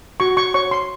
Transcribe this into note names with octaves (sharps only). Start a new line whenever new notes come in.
F#4 C#6
C#6
C#5 C#6
C6